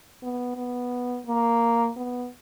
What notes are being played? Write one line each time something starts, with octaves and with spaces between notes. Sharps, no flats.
B3
B3
A#3
B3